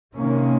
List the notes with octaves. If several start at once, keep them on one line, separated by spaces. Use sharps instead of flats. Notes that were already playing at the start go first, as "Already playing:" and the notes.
C3 D#3 A#3 C#4